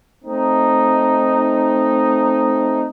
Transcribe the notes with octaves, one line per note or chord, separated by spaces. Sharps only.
A3 C4 D#4